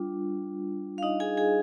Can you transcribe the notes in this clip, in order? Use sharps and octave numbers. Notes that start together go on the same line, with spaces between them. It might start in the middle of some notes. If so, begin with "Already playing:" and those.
Already playing: G3 D4 F4
F5
D#4 D#5
G#4 G#5
G#4 G#5